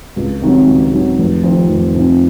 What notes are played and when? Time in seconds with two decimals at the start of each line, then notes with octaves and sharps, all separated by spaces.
0.16 C#2
0.41 C3 D#3 F#3
0.67 C#2
0.92 C3 D#3 F#3
1.18 F1
1.44 F2 C3 D#3
1.69 F1
1.94 F2 C3 D#3